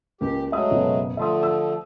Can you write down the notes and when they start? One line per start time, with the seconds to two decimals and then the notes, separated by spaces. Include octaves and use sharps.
0.21 C#2 A#3 G4
0.52 F#3 G#3 A3 E5 D#6
0.71 F#1 B2
1.17 D3 F3 A3 E5 C6 D#6
1.43 E6